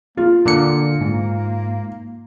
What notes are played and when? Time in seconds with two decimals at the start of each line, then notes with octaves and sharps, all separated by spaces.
0.17 A#3 F4
0.46 A#2 D3 C#7
1.01 G#2